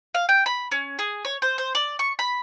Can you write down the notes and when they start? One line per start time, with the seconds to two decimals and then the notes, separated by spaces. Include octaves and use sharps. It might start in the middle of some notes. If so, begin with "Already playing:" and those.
0.15 F5
0.29 G5
0.46 B5
0.71 C#4
0.99 G#4
1.25 C#5
1.42 C5
1.58 C5
1.75 D5
1.99 C#6
2.19 B5